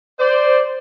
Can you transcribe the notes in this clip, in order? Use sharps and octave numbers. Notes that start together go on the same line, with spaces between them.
C5 D5